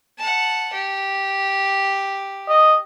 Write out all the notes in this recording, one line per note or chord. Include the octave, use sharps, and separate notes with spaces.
F#5 A5
G4
D#5